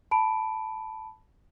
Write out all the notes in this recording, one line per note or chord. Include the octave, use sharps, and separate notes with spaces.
A5 B5 D7